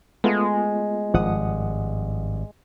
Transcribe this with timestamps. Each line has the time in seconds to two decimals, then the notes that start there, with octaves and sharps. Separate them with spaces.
0.24 G#3 A3 B3 F4
1.14 G#1 G2 F3 F#5 D#6